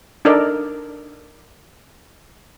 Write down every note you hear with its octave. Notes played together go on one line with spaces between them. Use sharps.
D4 D#4 A4 A#4 D5